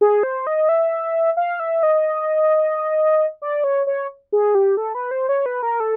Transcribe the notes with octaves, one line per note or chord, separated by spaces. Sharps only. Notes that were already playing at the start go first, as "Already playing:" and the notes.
G#4
C5
D#5
E5
F5
E5
D#5
D5
C#5
C#5
G#4
G4
A4
B4
C5
C#5
B4
A#4
A4